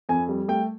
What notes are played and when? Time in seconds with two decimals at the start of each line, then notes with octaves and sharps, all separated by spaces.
0.09 F2 G#5
0.28 G3
0.48 A3 G5